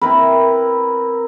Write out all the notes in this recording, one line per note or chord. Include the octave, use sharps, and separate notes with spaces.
C4 E4 A#4 B4